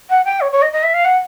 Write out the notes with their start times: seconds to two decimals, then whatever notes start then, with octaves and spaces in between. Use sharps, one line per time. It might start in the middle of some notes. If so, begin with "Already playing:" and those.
0.09 F#5
0.25 G5
0.40 C#5
0.51 C#5
0.62 D#5
0.72 D#5
0.83 E5
0.93 F5
1.04 F#5